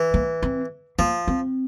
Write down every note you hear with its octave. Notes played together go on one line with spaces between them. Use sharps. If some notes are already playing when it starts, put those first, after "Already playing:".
Already playing: E3
A#3
C4
F3 A#3
C4